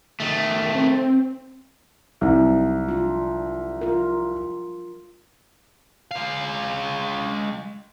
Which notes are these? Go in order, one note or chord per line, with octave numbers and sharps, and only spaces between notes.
D#3 A3
C4
C2 F#3 G3 D#4
D4 F4
F4 A#4
G#3 F5